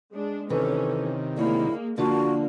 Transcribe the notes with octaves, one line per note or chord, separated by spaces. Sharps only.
G#3 D4
C3 D#3 E3 C#4 A4
D2 G#3 A#3 E4 C#5
D3 F3 A#3 F4 F#4